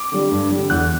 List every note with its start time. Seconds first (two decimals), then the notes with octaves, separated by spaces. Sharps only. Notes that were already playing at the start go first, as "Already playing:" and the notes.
Already playing: D6
0.12 D3 G3
0.31 G2
0.51 D3 G3
0.70 E2 F#6